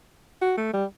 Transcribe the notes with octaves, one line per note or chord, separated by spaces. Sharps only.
F#4
A3
G3